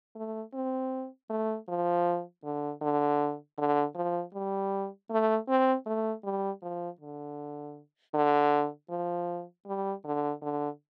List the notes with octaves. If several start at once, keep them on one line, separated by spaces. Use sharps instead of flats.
A3
C4
A3
F3
D3
D3
D3
F3
G3
A3
C4
A3
G3
F3
D3
D3
F3
G3
D3
D3